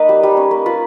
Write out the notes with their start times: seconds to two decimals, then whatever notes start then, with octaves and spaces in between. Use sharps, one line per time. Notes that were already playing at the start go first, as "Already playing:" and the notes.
Already playing: A#3 D#4 B4
0.09 G3
0.23 G3
0.37 C#4
0.51 A#3
0.66 F4 B4